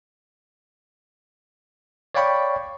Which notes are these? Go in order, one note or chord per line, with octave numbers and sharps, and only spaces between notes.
C#5 D5 F5 G5 B5 C#6